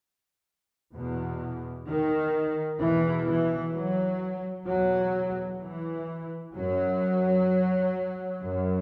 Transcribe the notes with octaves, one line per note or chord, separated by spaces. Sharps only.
E2 B2
D#3
E2 B2 E3
E3
F#3
E2 B2 F#3
E3
F#2 F#3
F#2